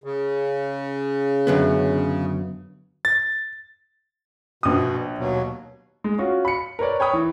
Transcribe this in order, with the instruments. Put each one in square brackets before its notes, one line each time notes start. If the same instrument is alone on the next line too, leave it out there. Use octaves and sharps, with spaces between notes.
[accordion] C#3
[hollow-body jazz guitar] F#2 D3 B3
[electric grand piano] A6
[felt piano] A#1 D#6 [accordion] B2
[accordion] D#2 B2 F#3
[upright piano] G#3
C#4 F4 F#4
B5 C#7
A#4 B4 C#5 D5
C#5 G5 B5 D#6
E3